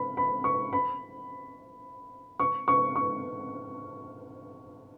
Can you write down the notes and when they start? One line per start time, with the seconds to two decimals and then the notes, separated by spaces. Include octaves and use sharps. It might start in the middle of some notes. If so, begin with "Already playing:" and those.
Already playing: B5
0.17 B5
0.44 C#6
0.73 B5
2.39 C#6
2.68 C#6
2.96 C#6